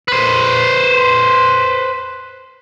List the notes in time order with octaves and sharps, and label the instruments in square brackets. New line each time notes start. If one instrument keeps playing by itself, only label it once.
[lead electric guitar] B4 C5